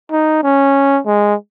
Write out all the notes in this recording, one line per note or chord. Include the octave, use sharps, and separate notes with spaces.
D#4
C#4
G#3